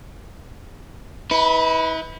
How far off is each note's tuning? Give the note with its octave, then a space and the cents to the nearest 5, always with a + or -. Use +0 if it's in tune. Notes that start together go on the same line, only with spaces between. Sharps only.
E4 -45 B4 +0